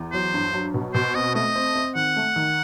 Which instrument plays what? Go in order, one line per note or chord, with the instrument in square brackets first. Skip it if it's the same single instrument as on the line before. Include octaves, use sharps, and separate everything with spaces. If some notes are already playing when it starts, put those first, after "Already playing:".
Already playing: [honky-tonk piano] E2
[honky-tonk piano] F#3 [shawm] C5
[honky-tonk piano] G2
F#3
B2
[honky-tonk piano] B2 [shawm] C5
[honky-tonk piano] C4 [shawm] D#5
[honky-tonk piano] A3 [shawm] D#5
[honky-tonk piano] C4
C4
[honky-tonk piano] D#3 [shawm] F#5
[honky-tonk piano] A3
D#3